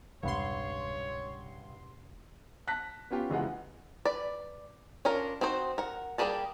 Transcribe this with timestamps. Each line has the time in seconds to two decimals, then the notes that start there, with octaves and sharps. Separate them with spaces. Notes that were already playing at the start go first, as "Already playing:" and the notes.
0.23 E1 C2 G2 C#3 C#5 F#5 B5 C6
2.67 A5 F#6 A#6 B6
3.11 B3 C#4 F4 G4
3.30 F#1 E3 G#3 F4 D#5 F#5
4.05 B4 D5
5.05 C#4 D4 F4 A#4
5.41 C4 D#4 F#4 C5
5.78 A#4 F#5
6.18 G3 A#3 G4 G#4 A5